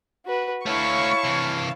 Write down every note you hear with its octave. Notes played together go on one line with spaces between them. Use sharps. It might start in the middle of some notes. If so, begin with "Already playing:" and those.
F#4 B4
A3 E4 F#4 C#5 F5 A5 C#6
C3 E3